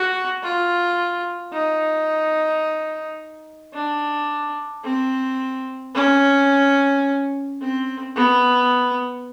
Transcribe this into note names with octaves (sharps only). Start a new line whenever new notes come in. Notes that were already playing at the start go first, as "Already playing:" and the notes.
Already playing: F#4
F4
D#4
D4
C4
C#4
C4
B3